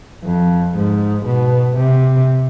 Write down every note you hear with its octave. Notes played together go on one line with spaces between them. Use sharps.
F2
G#2
B2
C3